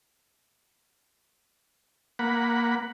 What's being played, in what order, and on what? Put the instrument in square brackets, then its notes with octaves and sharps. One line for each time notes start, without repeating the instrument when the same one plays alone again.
[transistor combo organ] A#3 F#5 B5